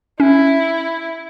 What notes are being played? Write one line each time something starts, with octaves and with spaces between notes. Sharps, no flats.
C#4 E4